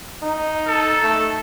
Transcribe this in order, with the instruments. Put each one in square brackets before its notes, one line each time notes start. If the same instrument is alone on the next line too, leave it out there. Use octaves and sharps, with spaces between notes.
[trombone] D#4
[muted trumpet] A4
[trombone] A3